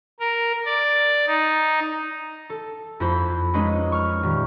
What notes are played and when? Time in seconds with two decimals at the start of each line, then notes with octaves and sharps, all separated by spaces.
0.20 A#4
0.65 D5
1.27 D#4
2.50 A4
3.00 F2 A#3 E4 C5 B5
3.54 G#3 C#4 D#4 F4 B4
3.92 C#6 F6
4.23 D#1